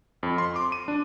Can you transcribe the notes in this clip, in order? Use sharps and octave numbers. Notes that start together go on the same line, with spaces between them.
F2
C6
D6
D#7
D4